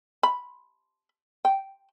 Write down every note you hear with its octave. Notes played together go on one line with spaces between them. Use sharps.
B5
G5